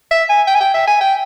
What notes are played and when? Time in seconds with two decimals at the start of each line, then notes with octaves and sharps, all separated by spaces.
0.11 E5
0.29 G#5
0.47 G5
0.55 G#5
0.60 G5
0.74 E5
0.88 G#5
1.01 G5